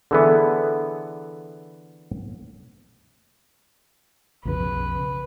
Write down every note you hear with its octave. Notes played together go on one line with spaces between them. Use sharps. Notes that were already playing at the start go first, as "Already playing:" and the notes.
D3 E3 B3 G#4 A4 E5
B1 F2 C#3 B4